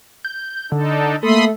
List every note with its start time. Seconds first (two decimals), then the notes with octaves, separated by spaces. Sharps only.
0.25 G6
0.72 D3 D4 D#4 A4
1.23 A3 A#3 A4 B5 C6 D#6